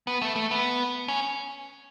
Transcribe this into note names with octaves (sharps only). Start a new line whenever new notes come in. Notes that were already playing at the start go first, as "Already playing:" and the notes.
B3
A3
A3
B3
C#4